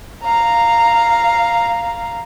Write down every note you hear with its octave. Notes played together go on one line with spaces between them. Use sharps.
F5 A#5